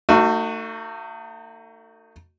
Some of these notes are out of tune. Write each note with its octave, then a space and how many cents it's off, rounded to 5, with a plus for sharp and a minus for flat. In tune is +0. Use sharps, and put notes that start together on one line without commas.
A3 +40 D#4 +0 F#4 +0